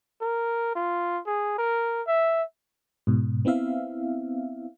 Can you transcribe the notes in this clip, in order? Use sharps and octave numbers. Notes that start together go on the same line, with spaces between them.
A#4
F4
G#4
A#4
E5
G#2 B2
B3 C4 E4 E5 F5